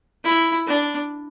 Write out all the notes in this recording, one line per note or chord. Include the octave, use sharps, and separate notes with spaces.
E4
D4